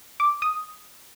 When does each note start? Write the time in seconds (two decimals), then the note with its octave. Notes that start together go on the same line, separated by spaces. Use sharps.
0.20 D6
0.42 D#6